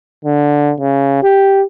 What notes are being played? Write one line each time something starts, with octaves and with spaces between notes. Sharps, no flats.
D3
C#3
G4